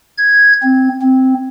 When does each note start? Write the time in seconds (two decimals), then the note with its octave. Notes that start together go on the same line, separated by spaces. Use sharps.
0.18 G#6
0.63 C4
1.02 C4